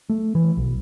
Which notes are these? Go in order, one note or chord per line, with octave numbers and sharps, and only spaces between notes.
A3
E3
B1